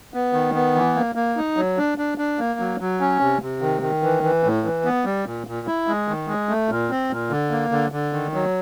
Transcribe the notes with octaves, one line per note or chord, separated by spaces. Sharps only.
B3
D#3
B3
E3
A#3
A#3
D#4
F#3
D4
D4
D4
A#3
F#3
F#3
C#4
C3
C3
D#3
D#3
E3
E3
A2
E3
B3
G3
A#2
A#2
E4
G#3
D#3
G#3
A3
A#2
C4
A#2
D3
A#3
D3
D3
D#3
F#3